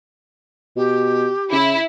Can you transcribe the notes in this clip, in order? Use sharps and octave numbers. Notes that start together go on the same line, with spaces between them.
B2 G4
C#3 E4